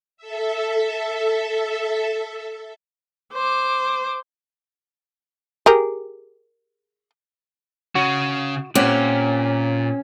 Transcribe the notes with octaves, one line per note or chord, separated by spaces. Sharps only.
A4 E5
C5 D6
G4 G#4 A#4
C#3 C#4 F#4
A#2 C4 C#4 G4 F#5